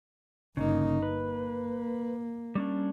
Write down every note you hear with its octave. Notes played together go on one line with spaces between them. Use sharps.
G1 C#3 A#3 D#4
A#3 B4
G3 C#4 D4